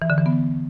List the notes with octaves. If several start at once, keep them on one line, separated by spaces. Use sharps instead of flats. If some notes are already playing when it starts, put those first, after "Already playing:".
E3
D3
E3
B3